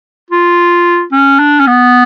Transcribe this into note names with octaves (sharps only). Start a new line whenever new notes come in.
F4
C#4
D4
C#4
B3